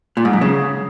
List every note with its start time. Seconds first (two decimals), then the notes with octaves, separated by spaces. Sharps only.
0.17 A#2
0.25 G#2
0.33 F#2
0.41 C#3